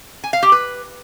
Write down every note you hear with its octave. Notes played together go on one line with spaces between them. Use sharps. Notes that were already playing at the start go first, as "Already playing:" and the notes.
G#5
F5
G4
B4